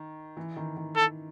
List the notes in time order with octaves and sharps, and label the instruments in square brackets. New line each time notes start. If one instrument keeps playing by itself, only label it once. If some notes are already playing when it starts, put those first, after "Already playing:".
Already playing: [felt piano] D#3
E3
D#3
D#3
[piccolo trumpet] A4